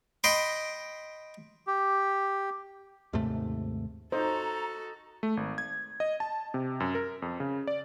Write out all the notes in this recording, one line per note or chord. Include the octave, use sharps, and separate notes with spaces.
D#5 G5 B5 C6
G4
D#2 G#2 C3 A3
D#4 F#4 A4 C5 A#5
A3
G#1
G#6
D#5
A5
C3
F#2
A#4
F2
C#3
D5